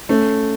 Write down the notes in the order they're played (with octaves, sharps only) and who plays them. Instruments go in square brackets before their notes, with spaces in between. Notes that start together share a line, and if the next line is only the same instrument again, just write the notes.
[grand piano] A3 [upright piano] C#4